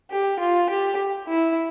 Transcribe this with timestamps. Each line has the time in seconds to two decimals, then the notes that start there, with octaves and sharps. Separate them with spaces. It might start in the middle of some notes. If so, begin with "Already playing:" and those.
0.11 G4
0.39 F4
0.70 G4
1.28 E4